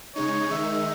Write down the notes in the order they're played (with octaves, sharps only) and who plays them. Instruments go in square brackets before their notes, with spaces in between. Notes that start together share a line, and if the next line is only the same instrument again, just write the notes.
[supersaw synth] C#3 G#3 D#4 [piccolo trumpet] C#5
[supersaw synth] D#3 G#3 D#4 [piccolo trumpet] E5